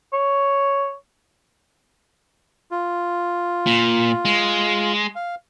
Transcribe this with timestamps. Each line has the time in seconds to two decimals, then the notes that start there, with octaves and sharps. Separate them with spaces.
0.13 C#5
2.71 F4
3.67 A#2
4.25 G#3
5.15 F5